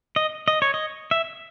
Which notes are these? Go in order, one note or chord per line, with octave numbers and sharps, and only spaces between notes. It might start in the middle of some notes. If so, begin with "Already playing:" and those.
D#5
D#5
C#5
D#5
E5